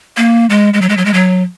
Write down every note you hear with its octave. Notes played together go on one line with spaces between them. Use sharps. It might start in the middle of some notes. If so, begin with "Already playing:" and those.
A#3
G#3
G#3
F#3
G#3
F#3
G#3
F#3